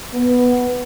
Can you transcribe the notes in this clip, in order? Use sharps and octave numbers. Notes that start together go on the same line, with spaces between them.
B3